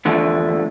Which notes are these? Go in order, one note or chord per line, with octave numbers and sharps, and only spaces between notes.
E2 D3 F3 A3 D4